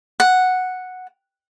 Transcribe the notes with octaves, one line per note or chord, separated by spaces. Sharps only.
F#5